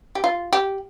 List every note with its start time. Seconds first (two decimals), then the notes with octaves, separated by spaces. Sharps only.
0.15 G4
0.24 F4
0.53 G4